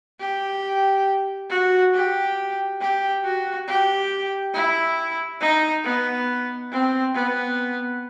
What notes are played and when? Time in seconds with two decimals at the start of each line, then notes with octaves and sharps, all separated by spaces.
0.20 G4
1.50 F#4
1.94 G4
2.81 G4
3.24 F#4
3.67 G4
4.53 E4
5.41 D#4
5.83 B3
6.71 C4
7.14 B3